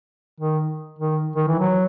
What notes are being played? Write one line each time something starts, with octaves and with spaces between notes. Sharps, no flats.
D#3
D#3
D#3
E3
F#3